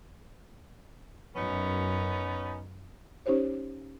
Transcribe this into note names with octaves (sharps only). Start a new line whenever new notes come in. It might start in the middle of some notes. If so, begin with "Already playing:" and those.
F#2 B3 C#4 D#4
C#4 D#4 G4 C5 C#5